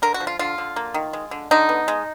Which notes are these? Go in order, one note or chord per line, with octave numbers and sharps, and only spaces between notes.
D3 A#4
F#4
F3
F4
D3 F4
D3
A#3
D#3
G#3
D3
D3 D#4
B3
G#3